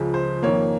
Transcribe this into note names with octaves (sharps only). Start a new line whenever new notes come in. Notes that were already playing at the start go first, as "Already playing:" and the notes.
Already playing: C#2 C#3 F3
C5
F2 D#3 A#3 C#5